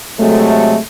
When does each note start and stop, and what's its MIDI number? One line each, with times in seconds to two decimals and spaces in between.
0.19 0.76 48
0.19 0.76 54
0.19 0.76 56
0.19 0.76 57